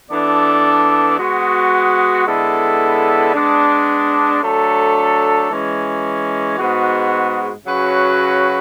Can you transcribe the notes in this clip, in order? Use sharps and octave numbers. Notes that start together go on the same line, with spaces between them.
E3 B3 D4 A4 D5
G#3 B3 F#4
D3 G#3 B3 E4 A4
G#3 B3 D4
F#3 A3 D4 A4
E3 G#3 C#4
G#2 G#3 B3 F#4
C#3 F#3 C#4 F#4 B4